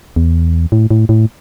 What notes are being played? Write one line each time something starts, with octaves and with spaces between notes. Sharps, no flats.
E2
A2
A2
A2